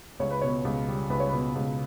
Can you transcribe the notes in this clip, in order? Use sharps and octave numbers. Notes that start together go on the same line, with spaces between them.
C#2 C#5
B4
B2 C#5
C#2
G3
C#2 B4
C#5
B2 B4
C#2